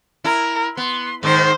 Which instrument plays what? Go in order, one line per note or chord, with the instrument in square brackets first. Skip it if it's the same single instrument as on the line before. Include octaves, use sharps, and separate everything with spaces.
[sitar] E4 [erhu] A#4
[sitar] B3 [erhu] C6
[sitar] G#2 D#3 D#4 [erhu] C5